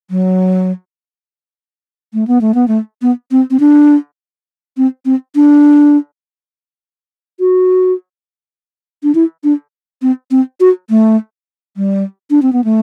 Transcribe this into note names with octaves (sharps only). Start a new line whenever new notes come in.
F#3
A3
B3
A3
B3
A3
B3
C4
C4
D4
C4
C4
D4
F#4
D4
E4
D4
C4
C4
F#4
A3
G3
D4
C4
B3
A3